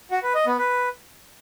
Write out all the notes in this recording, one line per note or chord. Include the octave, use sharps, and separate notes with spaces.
F#4
B4
D#5
B3
B4